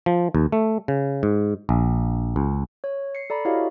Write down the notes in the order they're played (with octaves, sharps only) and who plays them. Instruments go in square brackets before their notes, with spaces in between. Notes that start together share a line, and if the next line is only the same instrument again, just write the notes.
[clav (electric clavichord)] F3
D#2
A3
C#3
G#2
A#1
C#2
[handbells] C#5
C7 C#7
A4 D5 A#5 B5
E4 F#4 G4 C#5 D#5 F5